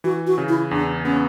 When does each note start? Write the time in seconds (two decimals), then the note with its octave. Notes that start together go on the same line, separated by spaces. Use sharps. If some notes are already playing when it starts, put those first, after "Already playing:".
0.04 E3 F#4
0.27 F#4
0.38 C#3
0.49 E4
0.71 E2 D4
1.05 B3 C#4